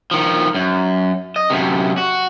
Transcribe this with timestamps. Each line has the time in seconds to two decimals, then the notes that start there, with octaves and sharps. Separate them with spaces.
0.11 D#3 F3
0.54 F#2
1.36 D#5
1.50 F#2 C3
1.98 F#4